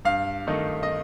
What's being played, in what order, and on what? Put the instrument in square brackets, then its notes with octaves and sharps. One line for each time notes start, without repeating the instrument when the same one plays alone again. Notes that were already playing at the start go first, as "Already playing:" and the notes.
[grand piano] G2 F5
D#3 A3 D#4
D#5